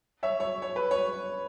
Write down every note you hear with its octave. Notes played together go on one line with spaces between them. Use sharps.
C#5 E5
C#5
C#5
B4
C#5